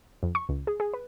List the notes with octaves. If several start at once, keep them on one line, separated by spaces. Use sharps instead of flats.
F2
C#6
C#2
G#4
G#4
B4